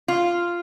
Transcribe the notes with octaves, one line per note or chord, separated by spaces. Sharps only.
F4